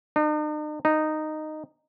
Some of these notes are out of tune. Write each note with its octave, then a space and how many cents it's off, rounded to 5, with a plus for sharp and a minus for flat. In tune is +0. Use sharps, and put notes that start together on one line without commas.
D#4 -45
D#4 -10